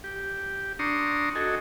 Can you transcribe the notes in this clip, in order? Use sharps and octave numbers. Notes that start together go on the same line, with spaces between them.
G4
D4 A#5 C6 C#6 D#6
F#4 A4 D#5 G#5